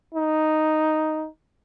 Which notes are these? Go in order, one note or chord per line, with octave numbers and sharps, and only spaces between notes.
D#4